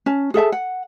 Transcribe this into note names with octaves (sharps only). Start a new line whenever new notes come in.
C#4 A5
G#4 A4 E5 A5
F#5